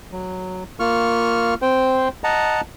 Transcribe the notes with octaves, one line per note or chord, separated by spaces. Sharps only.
F#3
A#3 F4 C#6 F6
C4 C5 G5
D#5 F#5 A5 A#5